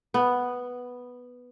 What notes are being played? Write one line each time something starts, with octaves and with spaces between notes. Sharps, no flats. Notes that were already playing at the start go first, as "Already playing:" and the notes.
B3